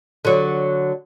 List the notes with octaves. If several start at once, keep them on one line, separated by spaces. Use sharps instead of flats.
D3 F#3